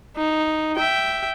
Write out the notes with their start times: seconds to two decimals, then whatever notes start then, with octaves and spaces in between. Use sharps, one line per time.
0.17 D#4
0.77 E5 G5